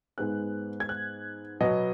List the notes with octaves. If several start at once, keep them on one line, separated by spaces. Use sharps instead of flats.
G#2 G#3 B3 F#6
G#6
F#6
B2 F#3 B3 D#5